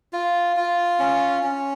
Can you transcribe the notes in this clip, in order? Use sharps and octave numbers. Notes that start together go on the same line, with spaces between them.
F4
F4
C#4
C#4